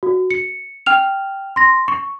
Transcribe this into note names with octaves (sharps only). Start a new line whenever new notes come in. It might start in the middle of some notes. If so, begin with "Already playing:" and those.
F#4
C#7
G5 F6 F7
C6 A#6
C#6